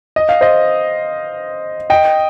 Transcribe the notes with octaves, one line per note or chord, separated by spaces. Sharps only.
D#5
F5
C5 D#5
D#5 G5